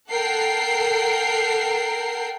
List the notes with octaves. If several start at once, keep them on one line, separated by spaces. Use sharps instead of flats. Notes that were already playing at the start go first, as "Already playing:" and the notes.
A4 A#4 F#5 G5 C7